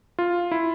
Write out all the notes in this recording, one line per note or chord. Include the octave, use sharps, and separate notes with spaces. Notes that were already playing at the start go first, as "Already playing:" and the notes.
F4
E4